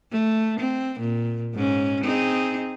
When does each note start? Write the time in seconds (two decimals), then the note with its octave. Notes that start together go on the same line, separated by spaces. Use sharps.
0.11 A3
0.60 C4
1.00 A#2
1.54 G#2 C#4
2.03 C4 D#4 G#4